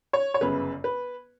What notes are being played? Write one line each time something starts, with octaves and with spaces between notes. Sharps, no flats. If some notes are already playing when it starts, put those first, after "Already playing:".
C#5
C#5
G1 F#2 C#3 B4
B4